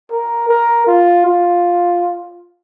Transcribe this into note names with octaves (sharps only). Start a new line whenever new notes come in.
A#4
A#4
F4
F4